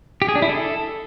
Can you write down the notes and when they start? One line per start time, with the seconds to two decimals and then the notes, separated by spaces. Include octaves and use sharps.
0.22 G4
0.28 G#4
0.35 D4
0.42 E4
0.49 A4